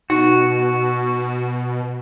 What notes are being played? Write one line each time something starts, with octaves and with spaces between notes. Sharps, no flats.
B2 D#4 F#4